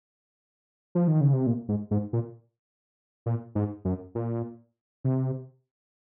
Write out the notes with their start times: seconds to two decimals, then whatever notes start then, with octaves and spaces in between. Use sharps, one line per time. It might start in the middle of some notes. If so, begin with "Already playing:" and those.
0.95 F3
1.08 D#3
1.21 C#3
1.33 C3
1.47 A#2
1.69 G#2
1.91 G#2
2.13 A#2
3.26 A#2
3.55 G#2
3.85 F#2
4.15 A#2
5.04 C3